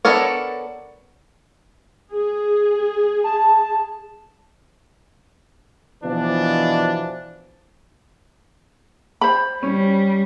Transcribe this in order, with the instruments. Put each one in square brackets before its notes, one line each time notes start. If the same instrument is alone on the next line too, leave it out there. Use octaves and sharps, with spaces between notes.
[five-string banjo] B3 D4 A4 A#4 C#5
[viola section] G#4
[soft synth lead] A5
[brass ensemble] B2 E3 F3 D4
[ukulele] C5 B5
[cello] G3 [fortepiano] C#4